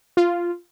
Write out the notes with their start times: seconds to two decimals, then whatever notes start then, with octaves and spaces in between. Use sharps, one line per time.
0.17 F4